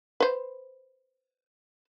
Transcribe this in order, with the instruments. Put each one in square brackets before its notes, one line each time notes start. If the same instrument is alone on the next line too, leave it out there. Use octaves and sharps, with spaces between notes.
[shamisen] B4 C5